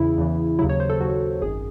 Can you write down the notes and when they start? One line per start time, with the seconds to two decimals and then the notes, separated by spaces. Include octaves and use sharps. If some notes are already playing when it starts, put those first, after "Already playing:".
Already playing: E2 C#3 E3 E4
0.18 E2 C#3 E3
0.58 D#2 C#3 F#3 E4
0.69 C#5
0.80 C5
0.90 A4
1.00 D#2 C#3 F#3 F#4
1.42 G#1 F#2 D#3 G#4